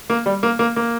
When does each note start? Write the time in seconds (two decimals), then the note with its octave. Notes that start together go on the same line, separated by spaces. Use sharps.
0.10 A#3
0.26 G3
0.43 A#3
0.59 A#3
0.76 A#3